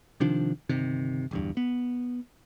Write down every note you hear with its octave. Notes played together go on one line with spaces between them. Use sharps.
C3 D#3 F3 D4
G1 C3 D#3
D1 E2 G2
B3